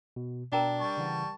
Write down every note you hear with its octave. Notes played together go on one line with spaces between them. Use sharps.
B2
B2 D4 A#4 G5 A#5
G3 A5 C#6
C#3 E3 F#5